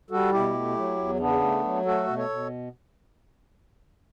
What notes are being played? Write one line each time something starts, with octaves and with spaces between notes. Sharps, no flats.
G3 F#4 A4
B2 E4 G4
A3
F#3
E2
C#3 B3 D4
A3
F#3
A3 F#4 A4
B2
A4 C#5
B2